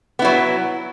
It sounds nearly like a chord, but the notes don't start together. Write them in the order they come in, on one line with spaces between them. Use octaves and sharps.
B3 E4 F#3